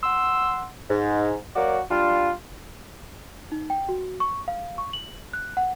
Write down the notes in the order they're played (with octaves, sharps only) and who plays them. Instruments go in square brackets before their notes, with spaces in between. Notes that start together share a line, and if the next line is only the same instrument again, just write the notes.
[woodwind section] F#5 C6 E6
G#2
F#3 A#3 F#4 D5
G3 D4 F4
[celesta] D#4
G5
F#4
C#6
F5
C#6
F#7
F#6
F#5